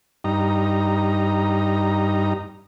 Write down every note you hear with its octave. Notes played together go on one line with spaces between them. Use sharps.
G2 D#4 A#5